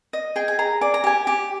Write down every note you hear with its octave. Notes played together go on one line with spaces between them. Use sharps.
D#5
G#4 G5
G#5
G#4 A#5
D5 G#5
A#5
G4 G#5
G4